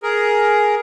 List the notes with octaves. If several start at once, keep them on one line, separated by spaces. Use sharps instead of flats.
G#4 A#4